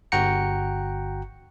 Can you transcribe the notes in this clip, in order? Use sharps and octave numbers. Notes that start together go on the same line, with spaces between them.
G1 F#4 F#5 G5 A#5 C#7